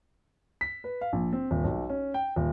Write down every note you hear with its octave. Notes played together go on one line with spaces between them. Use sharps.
B6
B4
F5
A#1
C4
D#1
B1
C#4
G5
D#1